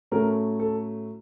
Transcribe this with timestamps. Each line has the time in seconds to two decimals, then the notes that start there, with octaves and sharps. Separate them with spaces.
0.12 A2 F#3 A3 C#4 A#4
0.60 A4